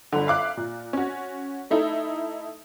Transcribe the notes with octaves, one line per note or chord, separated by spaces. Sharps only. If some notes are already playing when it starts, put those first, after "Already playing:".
G1 D3
E5 F5 D6 F#6
A#2
C#4 F#4
A3 D#4 E4 A4